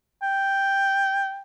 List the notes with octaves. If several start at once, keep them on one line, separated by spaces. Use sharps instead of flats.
G5